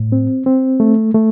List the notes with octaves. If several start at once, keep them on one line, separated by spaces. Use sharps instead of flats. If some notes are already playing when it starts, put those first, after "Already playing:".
Already playing: A2
C4
C4
A3
A3